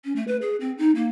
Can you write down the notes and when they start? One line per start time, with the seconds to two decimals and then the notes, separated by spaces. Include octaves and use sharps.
0.05 C#4
0.16 A3
0.28 B4
0.42 G#4
0.60 C4
0.78 D#4
0.95 A#3